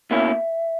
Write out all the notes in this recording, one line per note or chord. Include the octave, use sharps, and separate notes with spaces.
B2 A#3 C#4 E4 E5